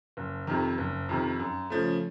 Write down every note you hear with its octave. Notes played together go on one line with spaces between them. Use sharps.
F#1
F2 C3 D#3
F#1
F2 C3 D#3
F#2
C#3 F3 A3